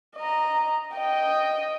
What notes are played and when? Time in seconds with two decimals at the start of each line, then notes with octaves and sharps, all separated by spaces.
0.16 D#5 A#5
0.94 D#5 G5